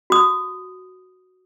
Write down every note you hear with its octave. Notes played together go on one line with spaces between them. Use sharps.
F#4 D#6